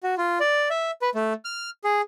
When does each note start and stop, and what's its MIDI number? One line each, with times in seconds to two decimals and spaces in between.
0.03 0.15 66
0.18 0.39 65
0.40 0.69 74
0.70 0.91 76
1.02 1.10 71
1.15 1.33 57
1.45 1.70 89
1.84 2.01 68